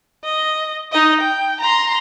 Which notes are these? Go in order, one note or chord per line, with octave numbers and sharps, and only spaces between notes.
D#5
D#4 D#5
G5
A#5 C6